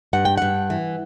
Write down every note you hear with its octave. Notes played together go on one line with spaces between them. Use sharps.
G2 F#5
G5
G2 F#5
E3